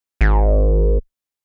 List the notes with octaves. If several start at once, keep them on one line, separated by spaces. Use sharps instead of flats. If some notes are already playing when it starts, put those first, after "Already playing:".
G#1